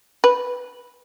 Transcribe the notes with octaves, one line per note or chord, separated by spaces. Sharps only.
B4